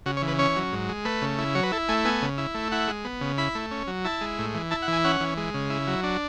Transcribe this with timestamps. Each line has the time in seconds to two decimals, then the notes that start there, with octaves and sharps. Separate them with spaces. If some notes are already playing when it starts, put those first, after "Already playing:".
0.06 C#3 F#4
0.17 C#5
0.22 E3
0.28 B4
0.39 C#4 C#5
0.56 F#3
0.72 G#2
0.89 G#3
1.05 A3 B4
1.22 C#3
1.38 E4
1.55 F#3 C#5
1.63 B4
1.72 E4 A4
1.89 A3 G#5
2.05 B3 G#5
2.22 C#3
2.38 E4
2.55 A3
2.72 E4 F#5
2.88 G#3
3.04 B3
3.21 C#3
3.38 E4 B5
3.55 A3
3.71 C#4
3.87 F#3
4.05 E4 A5
4.21 G#3
4.38 A2
4.54 E3
4.71 E4 A5
4.82 F#5
4.88 E3 G#5
5.04 C#4 F#5
5.21 E3
5.37 G#3
5.54 C#3
5.70 E4
5.87 F#3
6.03 D4